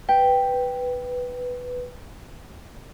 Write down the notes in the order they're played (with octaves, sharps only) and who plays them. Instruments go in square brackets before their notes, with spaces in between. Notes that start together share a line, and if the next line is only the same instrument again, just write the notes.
[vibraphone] B4 [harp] G5